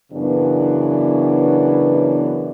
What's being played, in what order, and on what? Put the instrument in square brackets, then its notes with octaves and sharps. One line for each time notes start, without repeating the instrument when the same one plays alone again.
[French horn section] F#2 C#3 E3 B3 D4